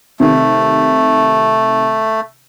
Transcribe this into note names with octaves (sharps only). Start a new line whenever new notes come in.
C3 D#3 A3